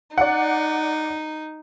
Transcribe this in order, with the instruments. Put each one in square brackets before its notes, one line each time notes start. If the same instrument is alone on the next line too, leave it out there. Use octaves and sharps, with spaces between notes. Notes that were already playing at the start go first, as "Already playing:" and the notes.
[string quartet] D#4 [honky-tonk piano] D5 F#5